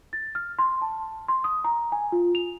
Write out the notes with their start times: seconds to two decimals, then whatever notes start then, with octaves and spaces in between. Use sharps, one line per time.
0.13 A6
0.35 F6
0.59 C6
0.82 A5
1.28 C6
1.44 D#6
1.64 A#5
1.92 G#5
2.12 F4
2.35 F7